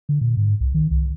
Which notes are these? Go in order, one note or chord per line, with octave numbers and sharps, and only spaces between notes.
D3
A#2
G#2
C2
D#3
C2